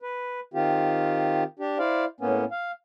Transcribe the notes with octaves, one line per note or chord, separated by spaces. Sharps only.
B4
D#3 C4 F4 G4
D4 G4
E4 C5 D5 F5
A2 A#3 B3 C#4
F5